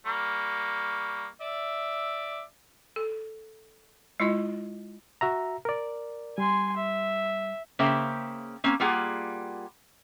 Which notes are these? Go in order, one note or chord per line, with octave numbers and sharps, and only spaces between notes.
G3 A#3 C#6
D5 E5
A4
G#3 E4 F4 D#5
F#4 E5 A#5
A#4 D5
G3 G#5 C6
E5
C#3 A#3 C5 E5 G5
A#3 C4 C#4
G3 A#3 F4 G#4 F#5